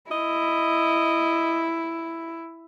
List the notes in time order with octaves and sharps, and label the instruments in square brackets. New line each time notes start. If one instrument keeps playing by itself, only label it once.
[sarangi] E4 [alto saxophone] D#5